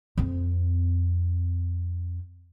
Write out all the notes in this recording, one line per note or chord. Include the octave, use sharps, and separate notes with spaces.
F2 C4